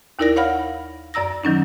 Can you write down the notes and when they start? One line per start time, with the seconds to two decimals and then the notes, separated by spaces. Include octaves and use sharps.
0.19 D#2 D#4 E4 A#4 D5 A#6
0.36 C#5 F5 F#5 B5 F6
1.14 F#2 D5 A#5 E6 A#6
1.44 D#3 F#3 C#4 D#4